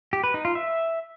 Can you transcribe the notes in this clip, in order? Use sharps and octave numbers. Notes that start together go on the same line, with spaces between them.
G4
B4
D#4
F4
E5